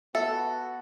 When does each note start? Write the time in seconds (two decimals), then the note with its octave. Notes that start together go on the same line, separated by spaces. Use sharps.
0.15 B3 F#4 A4 E5